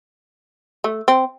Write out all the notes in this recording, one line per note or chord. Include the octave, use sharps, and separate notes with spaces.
A3
C4